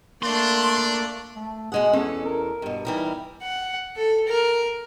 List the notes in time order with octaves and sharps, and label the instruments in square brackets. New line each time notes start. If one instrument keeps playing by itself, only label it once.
[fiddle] A3 D5 [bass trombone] A#3 [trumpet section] D4 [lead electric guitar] C6
[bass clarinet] A3
[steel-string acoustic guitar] B2 G#3 F#5 [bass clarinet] G#4
[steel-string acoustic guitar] E2 A4 [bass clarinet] C#4
[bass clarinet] A#4
[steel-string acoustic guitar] G2 B2
[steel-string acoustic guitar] E3 G3 A#4 [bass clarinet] D#4
[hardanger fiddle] F#5
A4
A#4